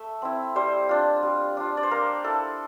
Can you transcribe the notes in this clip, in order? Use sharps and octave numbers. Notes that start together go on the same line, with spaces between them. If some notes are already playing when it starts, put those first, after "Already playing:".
Already playing: A3 E5
C4 E4
G3 C5
D4 F4
G3
D4 F4
D5
C5
A#3 A#4
E4 A4